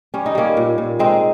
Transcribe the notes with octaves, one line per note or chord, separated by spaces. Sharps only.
G3 C#4
D#4
G3 A#3 C#4
A#2
A#2
G#3 C4 D#4